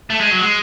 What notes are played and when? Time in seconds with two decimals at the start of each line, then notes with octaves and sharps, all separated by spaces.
0.10 A3
0.20 G#3
0.31 F#3
0.41 G#3